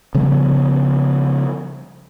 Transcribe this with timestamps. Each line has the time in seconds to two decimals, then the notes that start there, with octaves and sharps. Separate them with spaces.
0.15 C#3 F3 G3 B3